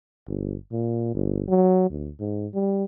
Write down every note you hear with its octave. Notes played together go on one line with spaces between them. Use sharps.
G1
A#2
G1
F#3
D2
G#2
G3